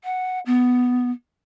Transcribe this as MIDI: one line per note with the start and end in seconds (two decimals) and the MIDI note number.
0.04 0.40 78
0.46 1.11 59